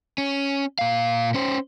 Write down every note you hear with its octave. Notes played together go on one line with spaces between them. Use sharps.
C#4
A#2 F5
C#4 C5